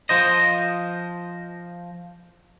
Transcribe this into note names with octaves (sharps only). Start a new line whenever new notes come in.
F3 C5 D#5